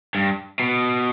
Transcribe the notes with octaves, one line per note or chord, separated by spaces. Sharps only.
G2
B2